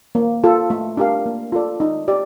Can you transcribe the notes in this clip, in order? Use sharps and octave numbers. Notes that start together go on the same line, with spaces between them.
A#3
F4 A4
A3
D4 G4 A#4 F5
A#3
F4 A4 D5
D#4
G4 D5